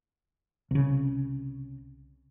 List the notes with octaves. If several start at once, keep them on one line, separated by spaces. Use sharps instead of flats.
C2 C#3